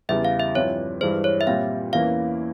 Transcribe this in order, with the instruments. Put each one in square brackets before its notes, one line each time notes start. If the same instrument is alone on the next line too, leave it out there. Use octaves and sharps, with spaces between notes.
[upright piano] E2 C#3 E3 G3 [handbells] E5
[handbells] F5
E5
[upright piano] G2 F3 C4 E4 [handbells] C#5
[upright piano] G2 E3 G#3 [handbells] C5
[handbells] C#5
E5
[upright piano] A#2 G3 C4 [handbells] F5
[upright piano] E2 E3 A#3 C#4 E4 [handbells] F5